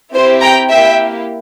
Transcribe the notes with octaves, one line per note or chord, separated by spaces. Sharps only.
C4 E4 G4 C5
G5 A#5
A#3 E4 G4 E5 G5